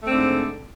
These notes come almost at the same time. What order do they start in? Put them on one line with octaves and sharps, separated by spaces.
A3 C4 D3 G#2